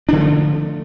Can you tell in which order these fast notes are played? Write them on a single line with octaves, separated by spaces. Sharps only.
D4 D3 F3 A3